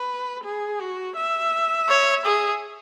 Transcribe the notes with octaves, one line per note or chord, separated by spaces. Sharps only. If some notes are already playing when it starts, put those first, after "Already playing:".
Already playing: B4
G#4
F#4
E5
C#5
G#4